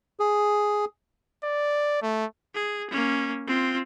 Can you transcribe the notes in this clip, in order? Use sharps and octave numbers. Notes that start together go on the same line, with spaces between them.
G#4
D5
A3
G#4
A#3 C#4
C4 F4